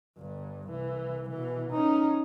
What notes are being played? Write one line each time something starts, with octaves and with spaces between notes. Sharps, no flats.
G1 G2
C2 E3
B2 E3
C#4 D#4